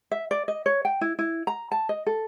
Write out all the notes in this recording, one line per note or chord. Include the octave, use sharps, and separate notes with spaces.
E5
D5
D#5
C#5
G5
E4
E4
A#5
A5
D#5
A4